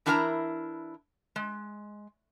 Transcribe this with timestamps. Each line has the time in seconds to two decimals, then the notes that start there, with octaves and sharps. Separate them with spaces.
0.06 E3 D4 E4 A#4 F#5 A#5
1.36 G#3